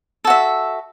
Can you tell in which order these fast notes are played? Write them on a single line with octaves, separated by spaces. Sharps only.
A4 F#4 E5